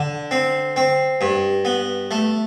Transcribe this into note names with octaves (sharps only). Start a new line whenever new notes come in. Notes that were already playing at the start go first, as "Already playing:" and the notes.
Already playing: D3
C4
C4
G2
B3
A3